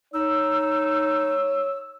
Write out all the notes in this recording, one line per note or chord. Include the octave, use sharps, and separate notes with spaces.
D#4 C#5 E6